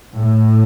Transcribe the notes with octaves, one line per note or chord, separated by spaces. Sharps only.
A2